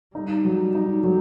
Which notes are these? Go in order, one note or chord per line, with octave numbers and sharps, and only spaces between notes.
G3 D#4
F#3
D#4
F#3